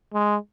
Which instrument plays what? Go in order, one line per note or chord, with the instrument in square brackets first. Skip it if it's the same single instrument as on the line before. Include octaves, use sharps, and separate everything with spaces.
[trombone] G#3